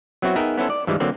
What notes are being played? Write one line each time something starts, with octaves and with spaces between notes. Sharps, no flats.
F#3 B3 C4 E4 F#4
B3 D#4 G#4 A#4 E5 G5
B3 C#4 E4 A4 C5
D5
G2 E3 F3 G3 G#3
D3 F#3 A#3 C4